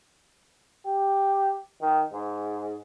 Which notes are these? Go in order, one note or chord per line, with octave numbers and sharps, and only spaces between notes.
G4
D#3
G#2